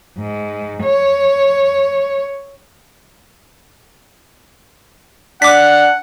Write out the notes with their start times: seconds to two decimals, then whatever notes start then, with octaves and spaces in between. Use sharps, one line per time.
0.17 G#2
0.83 C#5
5.42 D4 F#5 D6 B6